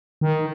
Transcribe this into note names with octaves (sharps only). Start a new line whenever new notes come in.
D#3